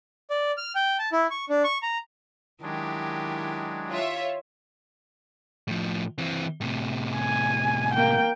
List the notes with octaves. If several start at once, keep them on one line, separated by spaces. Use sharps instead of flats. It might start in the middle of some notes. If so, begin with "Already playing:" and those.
D5
F6
G5
A5
E4
C#6
D4
C#6
A#5
D#3 F#3 G#3 D4 E4 G4
F4 C#5 E5
A2 F3
E3 C4
A2 C3
G#5
A#3 G5